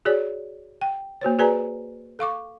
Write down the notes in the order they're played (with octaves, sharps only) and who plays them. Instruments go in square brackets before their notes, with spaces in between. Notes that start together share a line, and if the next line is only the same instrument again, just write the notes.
[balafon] F#4 G#4 C#5 D5
G5
A#3 F#4 C5 C#5
F#4 G#4 B4 D5 G#5 A#5
A4 F5 C#6 D6